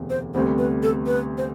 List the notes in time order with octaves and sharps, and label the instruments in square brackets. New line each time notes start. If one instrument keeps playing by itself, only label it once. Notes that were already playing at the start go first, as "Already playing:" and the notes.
Already playing: [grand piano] E1 D2 C3 B3
[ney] C5
[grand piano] D2 C3 G3 B3 [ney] C5
[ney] B4
A4
B4
C5